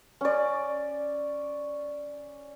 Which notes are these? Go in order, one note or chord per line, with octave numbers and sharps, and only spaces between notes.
C#4 D5